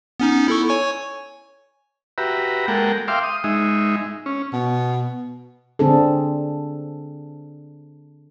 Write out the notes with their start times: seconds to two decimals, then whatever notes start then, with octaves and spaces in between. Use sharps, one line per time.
0.20 B3 C#4 D#4
0.48 E4 A4 C#6
0.69 C#5 G#5 C#6
2.18 F#4 G4 B4 E5 A#5
2.68 G#3 A#3 A4 A#4 F#5 G5
3.08 E5 F5 G5 C6 D6
3.23 D#6
3.44 G#3 D#4 E5
4.26 C#4
4.53 B2
5.79 D3 C4 D4 G#4 A4